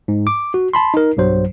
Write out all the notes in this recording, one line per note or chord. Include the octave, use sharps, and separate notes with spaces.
G#2
D6
F#4
A5 B5 C6
D#4 A#4
B1 G2 F#3 C5